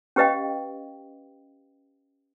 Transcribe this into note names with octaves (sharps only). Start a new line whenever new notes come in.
C#4 G4 B4 D#5 F5 G5